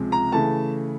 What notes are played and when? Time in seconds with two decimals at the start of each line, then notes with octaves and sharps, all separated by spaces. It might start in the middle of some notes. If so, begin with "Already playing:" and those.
Already playing: C#2 C3 F3 G#3
0.12 A#5
0.32 C#3 E3 A3 A5